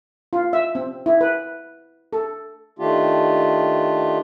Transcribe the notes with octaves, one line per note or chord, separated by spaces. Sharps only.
F4
E5
C4
E4
B4
A4
D#3 A3 D4 F4 G4